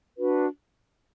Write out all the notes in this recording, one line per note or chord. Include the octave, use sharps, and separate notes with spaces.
D4 F#4 B4